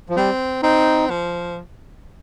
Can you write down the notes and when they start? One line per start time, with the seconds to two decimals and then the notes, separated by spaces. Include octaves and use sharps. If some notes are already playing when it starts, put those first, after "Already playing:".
0.10 F3
0.16 G3 C4
0.63 C4 D#4
1.10 F3